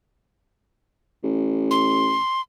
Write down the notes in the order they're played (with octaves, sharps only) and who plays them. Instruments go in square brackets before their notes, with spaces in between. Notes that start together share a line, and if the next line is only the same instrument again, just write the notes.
[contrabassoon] A1
[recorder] C6